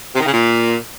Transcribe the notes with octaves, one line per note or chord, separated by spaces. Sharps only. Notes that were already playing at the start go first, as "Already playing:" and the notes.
C3
D#3
C#3
A#2